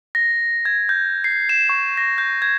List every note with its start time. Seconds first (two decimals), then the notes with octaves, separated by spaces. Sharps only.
0.15 A#6
0.65 G#6
0.89 G6
1.24 C7
1.49 E7
1.69 C#6
1.97 A#6
2.18 G6
2.42 G#6